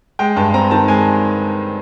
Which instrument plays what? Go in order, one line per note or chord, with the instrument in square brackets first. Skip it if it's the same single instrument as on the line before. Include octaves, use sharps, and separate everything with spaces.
[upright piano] G#3 G5
G2 A5
C4 A#5
D#3 A5
G#3 G#5